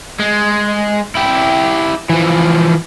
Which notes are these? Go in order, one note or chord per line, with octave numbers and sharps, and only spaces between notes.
G#3
E4 G4
E3 F3